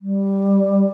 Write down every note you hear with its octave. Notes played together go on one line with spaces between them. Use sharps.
G3